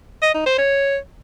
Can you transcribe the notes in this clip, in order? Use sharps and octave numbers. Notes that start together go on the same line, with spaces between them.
D#5
D#4
C5
C#5